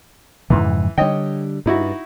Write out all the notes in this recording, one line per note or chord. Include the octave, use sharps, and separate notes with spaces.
F2 G#2 C#3 E3
D3 G3 C#5 D#5 G5
G2 D#4 E4 F#4